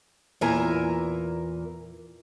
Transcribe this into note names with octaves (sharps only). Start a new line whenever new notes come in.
E2 A#2 A#4 E5 G#5 A#5